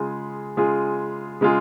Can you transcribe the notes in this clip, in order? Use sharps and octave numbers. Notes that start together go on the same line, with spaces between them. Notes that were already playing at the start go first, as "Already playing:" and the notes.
Already playing: C#3 G#3 F4 G#4
C#3 G#3 F4 G#4
C#3 G#3 F4 G#4